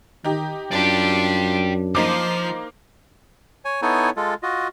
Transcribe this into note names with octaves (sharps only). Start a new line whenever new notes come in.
D#3 D#4 G4
F#2 D4 F4 D5 G5
F3 A#3 D#4 C5 D6
C#5 G#5
B3 D#4 E4 A4 C#5 G#5
G#3 F4 A4
F4 F#4 D#5